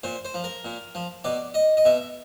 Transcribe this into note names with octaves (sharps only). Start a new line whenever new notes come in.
A#2 C5
C5
F3
A#4
A#2
F3
B2 D5
D#5
D#5
B2 E5